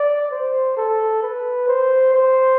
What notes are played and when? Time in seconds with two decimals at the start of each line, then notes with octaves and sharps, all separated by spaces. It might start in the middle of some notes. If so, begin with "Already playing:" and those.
Already playing: D5
0.31 C5
0.77 A4
1.23 B4
1.68 C5
2.14 C5